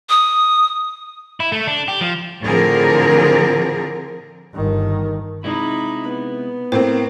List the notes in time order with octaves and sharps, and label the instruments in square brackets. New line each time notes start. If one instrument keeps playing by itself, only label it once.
[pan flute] D#6
[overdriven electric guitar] E4
A3
D4
G4
F3
[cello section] A2 D3 F3 C4 G#4 A#4
[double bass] G1 D#3
[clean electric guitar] C3 G#3 E4 [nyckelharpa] D#4 B5
[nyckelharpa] B3
[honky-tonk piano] A2 A#3 C4 [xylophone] C5